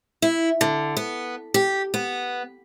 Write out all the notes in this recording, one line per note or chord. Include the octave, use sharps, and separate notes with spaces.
E4
D3
B3
G4
B3